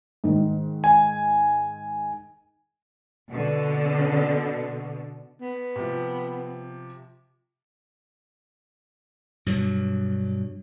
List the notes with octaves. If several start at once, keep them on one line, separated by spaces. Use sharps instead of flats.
G#2 D#3
G#5
B2 D3
B3
C3 F3
G2 B2 F#3